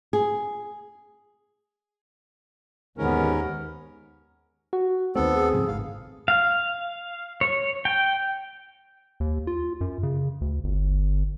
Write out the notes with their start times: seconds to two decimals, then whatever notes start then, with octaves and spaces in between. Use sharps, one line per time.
0.13 G#4
2.98 D#2 G#2 B3 C#4 A#4
4.73 F#4
5.16 D#2 A3 B3 C4 D#4 A4
5.33 G#4
5.53 G#2 C#3 F3
5.68 G#1 A2 D#3 F5
6.28 F5
7.41 C#5
7.85 G5
9.20 D#2
9.47 F4
9.81 F#2
10.03 C#3
10.41 D2
10.64 G1